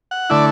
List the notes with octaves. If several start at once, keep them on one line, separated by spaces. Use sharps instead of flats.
F#5
D3 A3 E4 D5